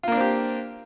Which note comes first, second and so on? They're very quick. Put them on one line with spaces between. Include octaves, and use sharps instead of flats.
F4 A#3 D4 C4 G4